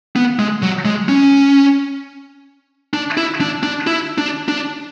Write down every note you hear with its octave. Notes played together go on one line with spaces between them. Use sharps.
B3
G#3
F#3
G#3
C#4
D4
E4
D4
D4
E4
D4
D4